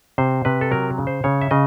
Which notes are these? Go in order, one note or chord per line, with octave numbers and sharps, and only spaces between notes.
C3 C5
C3 B4
A4
F#3 A#4
C#3
C5
C#3 C#5
E5
C#3 D#5